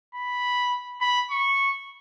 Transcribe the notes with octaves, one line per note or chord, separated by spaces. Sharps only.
B5
B5
C#6